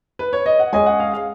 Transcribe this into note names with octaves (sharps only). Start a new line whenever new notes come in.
B4
C#5
D#5
F#5
G#3 C#4 G#4 D#5 G#5
F#5
F5
F5